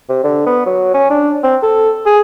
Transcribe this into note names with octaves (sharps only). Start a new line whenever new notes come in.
C3
D3
B3
F#3
C#4
D4
C4
A4
G#4